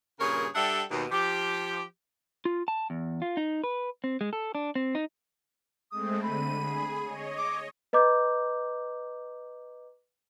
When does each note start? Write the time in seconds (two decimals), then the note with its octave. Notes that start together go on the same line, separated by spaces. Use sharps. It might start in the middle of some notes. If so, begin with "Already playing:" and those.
0.20 G2 A#2 C#3 G#4 A#4 C#5
0.55 G3 D4 G4 A4 E5 F#5
0.91 D#2 B2
1.11 F3 G4
2.45 F4
2.68 A5
2.90 E2
3.22 F4
3.37 D#4
3.64 B4
4.04 C4
4.21 G#3
4.33 A4
4.55 D4
4.75 C4
4.95 D#4
5.92 G#3 A3 C4 D#6
6.22 D3 B5 D#7
6.58 G#4
7.03 C#5 D#5
7.38 D6
7.93 B4 D#5 A#5 D6 G6